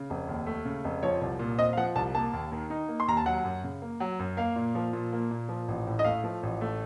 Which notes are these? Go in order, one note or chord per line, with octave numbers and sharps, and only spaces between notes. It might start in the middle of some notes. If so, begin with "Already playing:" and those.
Already playing: C#3
F1
D#2
A3
C#3
F1
F3 C#5
C2
A#2
C4 D#5
F5
F3 F#5
C2 A5
A#3 A5
D#2
D#3
D#4
A#3
C6
D#2 A#5
A5
F#3 F#5
F#2
C#3
A#3
F#3
F#2
A#3 F5
A#2
F3
A#2
A#3
A#2
F3
A1
A2
D#5
A3 F5
F3
A1
A3